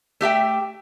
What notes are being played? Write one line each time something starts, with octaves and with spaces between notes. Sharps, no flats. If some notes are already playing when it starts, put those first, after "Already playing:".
A3 G4 E5 G5